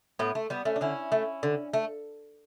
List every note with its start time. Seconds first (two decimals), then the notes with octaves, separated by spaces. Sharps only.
0.19 A2 B3
0.35 A3
0.50 G3 B3
0.65 A3 C#4
0.76 D4
0.81 D3 C#4 E4
1.12 A3
1.43 D3
1.73 A3